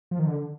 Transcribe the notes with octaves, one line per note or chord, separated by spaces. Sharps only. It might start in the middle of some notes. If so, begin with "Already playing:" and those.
F3
D#3
D3